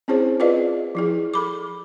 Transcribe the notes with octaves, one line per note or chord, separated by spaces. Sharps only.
C4 C#4 E4 G#4 C5 C#5
F4 G#4 B4 D5 D#5 F5
F3 E4 G#4
A4 B5 D6